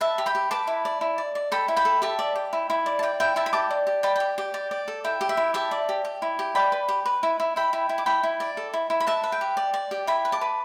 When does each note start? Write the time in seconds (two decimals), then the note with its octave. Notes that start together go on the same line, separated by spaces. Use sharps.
0.01 B4 E5 A5
0.18 G4
0.26 G5 B5
0.35 G4
0.51 B4 A5 D6
0.67 E4
0.85 D5
1.01 E4
1.18 D5
1.35 D5
1.52 A4 G5 B5
1.68 E4
1.76 G5 B5
1.85 A4
2.02 G4 E5 A5
2.19 D5
2.36 G4
2.53 E4
2.70 E4
2.86 D5
2.99 A5
3.03 D5 G5
3.20 E4 G5
3.36 E4 E5 A5
3.46 B5
3.53 G4 A5 D6
3.71 D5
3.87 G4
4.03 D5 G5 B5
4.16 G4 G5
4.38 G4
4.54 D5
4.71 D5
4.88 A4
5.04 E4 G5
5.21 G4
5.29 E5
5.37 E4
5.54 G4 E5 A5
5.71 D5
5.89 G4
6.05 G4
6.22 E4
6.39 G4
6.55 D5 G5 B5
6.72 B4
6.89 G4
7.06 B4
7.23 E4
7.40 E4
7.56 E4 G5 B5
7.73 E4
7.89 E4
7.98 D6
8.06 E4 G5 B5
8.23 E4
8.40 D5
8.57 A4
8.74 E4
8.90 E4
9.00 B5
9.07 B4 E5 A5
9.24 B4
9.32 G5
9.41 G4
9.57 D5
9.74 D5
9.91 G4
10.07 E4 G5 B5
10.25 B4
10.32 A5 D6
10.41 B4